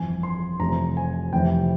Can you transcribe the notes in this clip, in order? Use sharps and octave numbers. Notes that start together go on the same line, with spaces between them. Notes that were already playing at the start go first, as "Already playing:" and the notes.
Already playing: G1 F2 E3 G#5
C6
F1 F2 C3 E3 A#5
G#5
F1 F2 C3 E3 G5